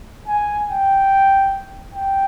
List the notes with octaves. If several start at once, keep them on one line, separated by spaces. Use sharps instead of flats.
G#5
G5
G5